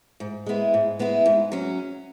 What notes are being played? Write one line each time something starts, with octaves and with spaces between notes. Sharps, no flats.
G#2
G#3 B3 E4
G#2
G#3 B3 E4
G#2
F#3 C#4